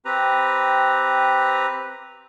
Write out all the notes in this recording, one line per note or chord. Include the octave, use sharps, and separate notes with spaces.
C4 G4 B4 A#5